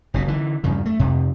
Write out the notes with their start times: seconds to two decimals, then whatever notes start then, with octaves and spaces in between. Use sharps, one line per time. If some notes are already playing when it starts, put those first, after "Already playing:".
0.14 F#1 B2
0.28 D3 E3
0.64 E2 G2 C#3
0.85 A3
0.99 F2 C3